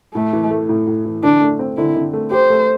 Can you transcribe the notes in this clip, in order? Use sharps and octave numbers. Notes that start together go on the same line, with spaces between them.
A2 A3
E3
A3
A2
A2
E3
D3 D4
A3
C4
D3 E4
D3
A3
G4 C5
A3